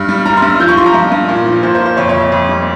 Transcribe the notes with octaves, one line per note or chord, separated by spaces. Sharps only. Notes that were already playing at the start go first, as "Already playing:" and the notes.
Already playing: G2
G3
G3 A#5
C6
G2
E6
F3 G6
C#6
F3 C6
A#5
G2
G2
A#2
F3
A#2 C5
C5
A#2
C5
F2 C#5
C#5
F2
E5
F2
G3